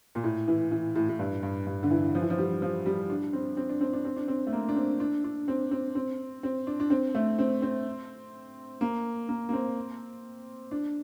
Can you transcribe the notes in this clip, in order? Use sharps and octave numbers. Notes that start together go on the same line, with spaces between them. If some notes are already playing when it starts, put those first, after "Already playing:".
A#2
A2
E3
E3
A2
A2
G2
G2
G2
D3
E3
F3
E3
F3
G3
F3
G3
D4
C4
C4
D4
C4
D4
C4
D4
C4
A3
A#3
D4
C4
D4
D4
C4
C4
C4
C4
D4
D4
C4
A3
C4
C4
A#3
A#3
A#3
C4
D4